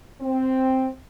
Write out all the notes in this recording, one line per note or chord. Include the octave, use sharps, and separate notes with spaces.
C4